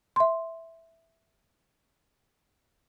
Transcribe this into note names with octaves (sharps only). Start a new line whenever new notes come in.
E5 C6